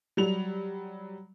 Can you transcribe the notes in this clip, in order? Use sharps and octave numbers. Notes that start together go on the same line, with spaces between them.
F#3 G3 F7